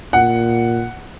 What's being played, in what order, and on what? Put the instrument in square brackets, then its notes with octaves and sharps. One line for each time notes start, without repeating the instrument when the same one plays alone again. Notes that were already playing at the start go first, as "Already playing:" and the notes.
[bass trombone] A#2 [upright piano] F#5